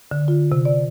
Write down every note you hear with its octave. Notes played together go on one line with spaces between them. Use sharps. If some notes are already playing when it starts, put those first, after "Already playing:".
D3
F4
C3
D5